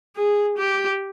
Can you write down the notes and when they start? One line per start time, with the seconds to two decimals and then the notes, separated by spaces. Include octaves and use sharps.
0.16 G#4
0.58 G4